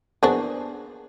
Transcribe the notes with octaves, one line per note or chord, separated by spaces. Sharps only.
A#3 B3 D4 F#4 G#4 C5